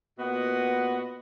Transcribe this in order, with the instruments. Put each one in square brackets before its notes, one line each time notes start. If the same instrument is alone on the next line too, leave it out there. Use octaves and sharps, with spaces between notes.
[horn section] A#2 B3 F#4 D#5 F#5